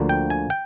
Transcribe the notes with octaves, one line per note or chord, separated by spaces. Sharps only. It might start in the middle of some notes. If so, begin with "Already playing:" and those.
Already playing: D2 D3 F3 A#3
G5
G#5
G5